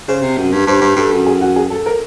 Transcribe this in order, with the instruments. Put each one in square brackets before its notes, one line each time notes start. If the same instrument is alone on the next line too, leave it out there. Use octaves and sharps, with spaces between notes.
[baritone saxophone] C#3 [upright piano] C5
[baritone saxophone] C3
F#2
G2
[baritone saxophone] G2 [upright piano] C5
[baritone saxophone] G2
[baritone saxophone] G2 [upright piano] A4
[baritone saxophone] F#2
[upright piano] G#4
F#4
G#4
A4
A#4